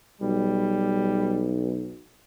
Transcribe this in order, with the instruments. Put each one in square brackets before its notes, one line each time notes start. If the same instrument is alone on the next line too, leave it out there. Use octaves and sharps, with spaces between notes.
[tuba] B1 [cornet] G3